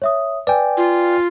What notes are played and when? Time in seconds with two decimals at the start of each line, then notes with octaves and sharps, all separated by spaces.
0.02 C#5 E5 D#6
0.47 B4 D5 G5 G#5
0.77 F4